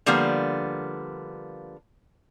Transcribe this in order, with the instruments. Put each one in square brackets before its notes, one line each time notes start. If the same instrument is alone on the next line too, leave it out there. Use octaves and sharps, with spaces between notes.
[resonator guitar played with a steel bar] D3 F3 G3 A#3 B3